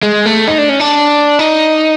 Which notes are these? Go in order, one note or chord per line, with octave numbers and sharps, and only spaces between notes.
G#3
A3
D#4
D4
C#4
D4
D#4